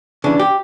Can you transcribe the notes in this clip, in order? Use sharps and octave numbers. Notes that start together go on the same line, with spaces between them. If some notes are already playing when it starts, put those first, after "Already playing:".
C#3 E3 D4
G4